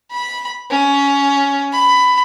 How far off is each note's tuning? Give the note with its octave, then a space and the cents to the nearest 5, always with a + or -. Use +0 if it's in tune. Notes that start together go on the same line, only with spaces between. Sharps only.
B5 -10
C#4 +15
B5 +15